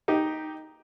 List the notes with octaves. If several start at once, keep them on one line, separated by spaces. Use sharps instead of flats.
D#4 G4